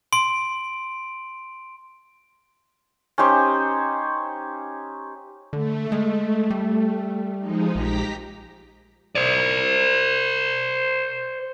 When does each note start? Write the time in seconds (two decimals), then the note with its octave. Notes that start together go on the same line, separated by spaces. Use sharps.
0.13 C6 D7
3.18 C#4 D#4 G4 C5
5.53 D3 A3
5.92 G#3
6.50 G3
7.39 F3 G#3 D#4
7.75 A#1 G4 A#5 B6
9.15 C5 D5